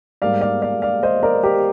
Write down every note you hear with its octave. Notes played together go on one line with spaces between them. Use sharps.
G#2 G3 A#3 D5 F5
D5 F5
D5 F5
D5 F5
C5 D#5
A#4 D5
G4 A#4